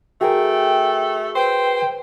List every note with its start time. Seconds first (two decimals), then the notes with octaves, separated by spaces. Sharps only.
0.21 A3 F#4 G#4 A#4 G5
1.35 B4 C5 G5